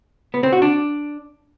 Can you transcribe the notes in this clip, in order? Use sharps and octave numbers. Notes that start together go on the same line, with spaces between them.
B3
C4
F#4
D4